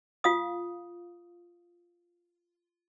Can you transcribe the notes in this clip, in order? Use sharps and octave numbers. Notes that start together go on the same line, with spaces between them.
F4 F5 D#6